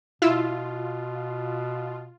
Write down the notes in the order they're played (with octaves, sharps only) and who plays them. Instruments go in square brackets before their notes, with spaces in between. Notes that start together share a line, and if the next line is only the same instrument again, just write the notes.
[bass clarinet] B2 [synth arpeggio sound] E4 E6 [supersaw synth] F4